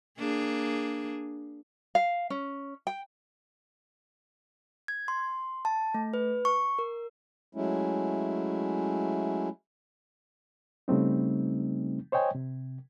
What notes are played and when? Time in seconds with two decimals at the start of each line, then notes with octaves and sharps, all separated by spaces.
0.18 A#3 D4 G#4
1.95 F5
2.30 C#4
2.87 G5
4.88 G#6
5.08 C6
5.65 A5
5.94 A3
6.14 B4
6.45 C#6
6.79 A#4
7.55 F#3 G#3 A3 C#4 E4
10.88 C#3 G3 A3 C4 D#4
12.12 C5 C#5 D#5 G5 G#5
12.35 C3